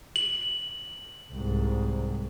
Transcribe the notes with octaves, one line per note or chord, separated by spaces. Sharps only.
F#7
C2 G#2